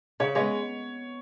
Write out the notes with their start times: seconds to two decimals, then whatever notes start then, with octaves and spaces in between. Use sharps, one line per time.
0.20 C#3 C#5
0.35 G#3 B3 C#5